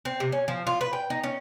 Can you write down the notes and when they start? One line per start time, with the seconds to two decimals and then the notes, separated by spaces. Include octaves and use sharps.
0.05 C4
0.20 C3
0.32 C#4
0.48 F3
0.67 F4
0.81 B4
0.93 G5
1.10 D#4
1.23 C#4